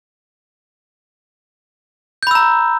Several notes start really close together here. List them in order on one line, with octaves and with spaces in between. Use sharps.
G6 B5 E6 A#5